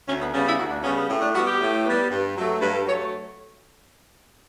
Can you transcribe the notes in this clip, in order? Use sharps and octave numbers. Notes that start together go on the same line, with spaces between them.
D2 C#4
B3
C#3 G3 B3 C#4
E4
D2 F#4
D4
C#3 G3 B3 C#4
B3
A2 C#4
D4
G3 B3 F#4
G4
A2
G3 B3
G2
F#3 A3
G2 B4
A4
F#3 A3 C#5
C#5